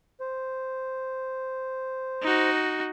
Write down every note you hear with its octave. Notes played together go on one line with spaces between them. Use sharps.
C5
D#4 F#4